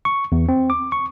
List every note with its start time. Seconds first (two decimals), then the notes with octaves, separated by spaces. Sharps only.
0.05 C#6
0.32 E2
0.49 C4
0.70 D6
0.92 C#6